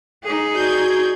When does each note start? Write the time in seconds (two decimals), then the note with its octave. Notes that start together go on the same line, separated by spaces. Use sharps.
0.23 D#4 G#4
0.53 F#4 D5 G6 G#6